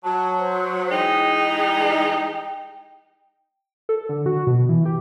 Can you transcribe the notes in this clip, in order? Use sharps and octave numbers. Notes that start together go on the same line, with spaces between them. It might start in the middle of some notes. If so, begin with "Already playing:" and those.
F#3 A5
C5
E3 G#3 D#4 G5
A4
D3
F#4
B2
E3
G4